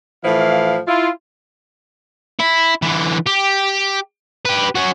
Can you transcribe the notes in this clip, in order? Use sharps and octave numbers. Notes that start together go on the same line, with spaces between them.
A2 E3 F3 E4 F5
E4 F4
E4
D3 E3
G4
G4 B4
C#4 F#4